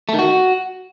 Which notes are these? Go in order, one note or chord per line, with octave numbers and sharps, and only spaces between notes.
A3
D#3
F#4